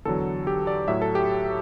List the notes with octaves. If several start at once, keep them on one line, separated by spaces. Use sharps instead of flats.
E2 D3 F#3 A4
G4
D5
A2 F#3 E5
A4
G4